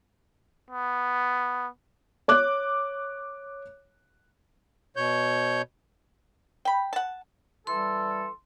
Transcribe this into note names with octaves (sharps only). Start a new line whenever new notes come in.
B3
C#5 D6 F#6
B2 C#5 G6
G5 B5
F#5 A5
E3 G3 A4 C6